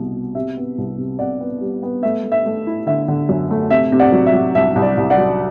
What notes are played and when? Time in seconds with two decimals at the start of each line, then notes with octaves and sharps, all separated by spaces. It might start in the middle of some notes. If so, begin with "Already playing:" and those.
Already playing: C2 B2
0.15 B2
0.35 C3 E5
0.57 B3
0.78 C2
0.98 C3
1.19 C3 D5 F#5
1.40 B3
1.61 G3
1.83 B3
2.03 A3 E5
2.24 A3
2.32 E5
2.46 A3
2.67 E4
2.86 D3 E5
3.08 D3
3.29 F#2
3.51 A3
3.70 C3 E5
3.92 C3
3.99 D5 F#5
4.12 F#3
4.26 E5
4.33 F#3
4.55 C2 E5
4.76 C2
4.82 D5
4.97 C2
5.10 D5 F#5
5.17 F#3